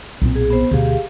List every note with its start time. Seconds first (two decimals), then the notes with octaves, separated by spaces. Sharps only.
0.21 B1 A#2 C4
0.35 G#4
0.50 B3 C5
0.71 D2 B2 G4 G#4 F5